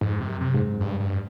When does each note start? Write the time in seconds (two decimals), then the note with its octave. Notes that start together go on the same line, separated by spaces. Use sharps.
0.01 F2 G#2
0.21 C3
0.27 F#2
0.41 C3
0.54 G#2
0.80 G2
1.00 G2